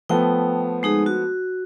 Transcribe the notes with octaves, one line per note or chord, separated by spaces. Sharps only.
F3 A3 B3 G5
G#3 D#4 G#4
F#4